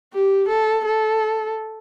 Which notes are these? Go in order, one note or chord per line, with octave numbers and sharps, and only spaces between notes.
G4
A4
A4